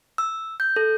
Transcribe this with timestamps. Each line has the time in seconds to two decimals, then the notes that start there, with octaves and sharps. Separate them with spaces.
0.18 E6
0.60 G6
0.76 A4